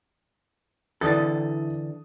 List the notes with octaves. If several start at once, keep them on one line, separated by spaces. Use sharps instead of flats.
D3 E3 E4 A4 D#6 A6